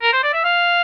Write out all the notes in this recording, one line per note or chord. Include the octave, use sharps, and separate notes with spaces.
A#4
C5
D5
E5
F5